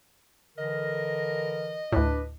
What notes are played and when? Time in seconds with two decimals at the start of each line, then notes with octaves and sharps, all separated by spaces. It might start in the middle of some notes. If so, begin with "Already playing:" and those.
0.58 D3 E3 A#4 D#5
1.92 D2 A2 D4 B4